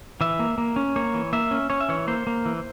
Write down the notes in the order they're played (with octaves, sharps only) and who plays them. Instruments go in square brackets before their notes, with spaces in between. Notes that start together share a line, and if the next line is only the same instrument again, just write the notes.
[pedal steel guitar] E3 E5
A#3
A#3
C#4
A#3 C#5
E3
A#3 E5
C#4
C#4 C#5
E5
E3 C#5
A#3 C5
A#3
E3